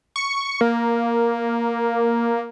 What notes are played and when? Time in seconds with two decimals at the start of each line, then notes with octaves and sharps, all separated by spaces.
0.16 C#6
0.61 A#3